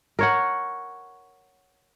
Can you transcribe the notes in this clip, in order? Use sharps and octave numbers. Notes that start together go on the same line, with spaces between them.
A#4 C#5 F#5